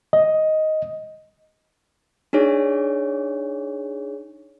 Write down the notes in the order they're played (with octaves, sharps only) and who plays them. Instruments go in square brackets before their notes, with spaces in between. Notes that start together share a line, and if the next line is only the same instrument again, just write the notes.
[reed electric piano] D#5
[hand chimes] D4 D#4 G#4 C#5